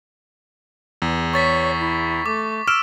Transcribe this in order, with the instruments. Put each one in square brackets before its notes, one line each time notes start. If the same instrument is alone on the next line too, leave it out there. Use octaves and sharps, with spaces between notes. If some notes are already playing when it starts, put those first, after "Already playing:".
[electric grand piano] E2
[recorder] C#5 [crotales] C#6 A6 B6
[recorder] E4
[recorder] A3 [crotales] D6
[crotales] E6 D7 E7 [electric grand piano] F6